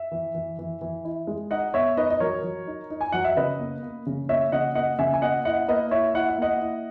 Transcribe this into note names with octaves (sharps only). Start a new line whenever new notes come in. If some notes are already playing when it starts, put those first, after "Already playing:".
Already playing: E5
E3
E3
E3
E3
E4
G#3
D#4 D#5 F#5
B3 C#5 E5
D#4 B4 D#5
D#5
F#3 A#4 C#5
F#3
D#4
D#4
G#5
F#3 F#5
E5
C#3 B4 D#5
A#3
A#3
C#3
A#3 C#5 E5
C#3 D#5 F#5
A#3 D#5 F#5
C#3 E5 G#5
G#5
A#3 D#5 F#5
E4 D#5 F#5
A#3 B4 D#5
E4 C#5 E5
E4 F#5
E5
A#3 D#5 F#5
E4